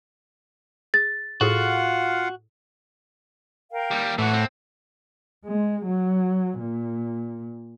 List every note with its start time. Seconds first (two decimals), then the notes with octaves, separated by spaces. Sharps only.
0.94 G#4 A6
1.41 A2 F4 F#4 G#4 A4 F5 F#5
3.72 A#4 F5 G5
3.91 D#2 G3
4.18 A2 E3 F#4 F#5
4.34 C4
5.45 G#3
5.86 F#3
6.59 A#2